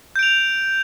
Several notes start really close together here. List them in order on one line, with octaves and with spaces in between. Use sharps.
G6 D7 F7